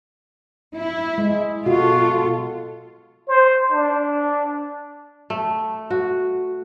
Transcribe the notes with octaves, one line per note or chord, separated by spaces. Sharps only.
E4
G#3
B2 F4 F#4 A4
C5
D4
A3
F#4